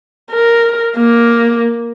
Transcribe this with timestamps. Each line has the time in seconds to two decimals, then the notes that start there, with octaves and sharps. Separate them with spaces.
0.31 A#4
0.97 A#3